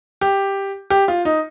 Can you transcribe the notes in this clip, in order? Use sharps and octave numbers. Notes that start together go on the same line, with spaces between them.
G4
G4
F4
D#4